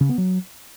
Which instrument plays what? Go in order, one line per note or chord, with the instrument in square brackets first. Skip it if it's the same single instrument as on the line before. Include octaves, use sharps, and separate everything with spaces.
[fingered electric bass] C#3
B3
F#3